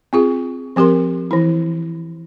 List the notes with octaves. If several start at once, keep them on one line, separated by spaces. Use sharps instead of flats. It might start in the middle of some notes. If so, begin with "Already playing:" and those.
C4 F4 G#4
F3 C4 G4 A#4 C6
E3 E4